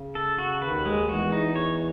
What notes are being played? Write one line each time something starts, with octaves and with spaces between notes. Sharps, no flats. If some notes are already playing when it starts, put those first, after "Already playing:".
Already playing: C#3
A4
F#4
D#2 D#3 B4
G#3
E2 E3 F#4
D#4
C#5